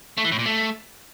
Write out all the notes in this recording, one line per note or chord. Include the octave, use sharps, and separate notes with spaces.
A3
E3
A2
A#2
A3